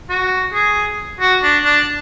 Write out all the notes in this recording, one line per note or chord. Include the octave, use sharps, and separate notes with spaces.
F#4
G#4
F#4
D4
D4